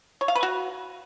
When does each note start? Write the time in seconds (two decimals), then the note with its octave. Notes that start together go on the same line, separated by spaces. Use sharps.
0.21 C#5
0.28 F5
0.35 B4
0.43 F#4